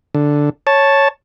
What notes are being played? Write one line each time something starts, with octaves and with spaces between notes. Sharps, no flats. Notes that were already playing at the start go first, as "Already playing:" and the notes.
D3
C#5 A5